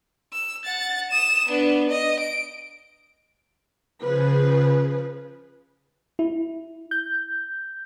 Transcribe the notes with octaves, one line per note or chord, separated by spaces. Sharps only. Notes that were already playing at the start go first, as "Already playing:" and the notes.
E6
F#5 A6
D#6 E7
B3 D4
D#5
D7
C#3 F3 G#4 B4
E4
G6